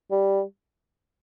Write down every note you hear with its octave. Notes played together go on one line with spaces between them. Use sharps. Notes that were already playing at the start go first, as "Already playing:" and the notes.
G3